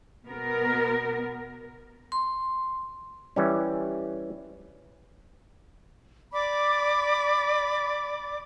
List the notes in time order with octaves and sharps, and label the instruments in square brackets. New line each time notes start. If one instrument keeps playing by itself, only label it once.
[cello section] B2 B3 A#4
[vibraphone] C6
[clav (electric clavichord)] E3 G3 C#4
[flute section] D5 B5 D6